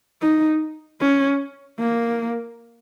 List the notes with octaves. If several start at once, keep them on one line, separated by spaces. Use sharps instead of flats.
D#4
C#4
A#3